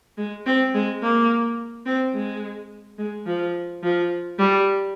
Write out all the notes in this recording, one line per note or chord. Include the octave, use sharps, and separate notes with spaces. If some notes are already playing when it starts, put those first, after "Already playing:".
G#3
C4
G#3
A#3
C4
G#3
G#3
F3
F3
G3